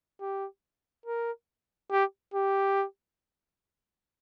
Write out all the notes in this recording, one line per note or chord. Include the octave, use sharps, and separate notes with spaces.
G4
A#4
G4
G4